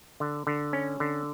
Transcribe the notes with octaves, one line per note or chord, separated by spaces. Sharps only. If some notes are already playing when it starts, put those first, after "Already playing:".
D3
D3
C#4
D3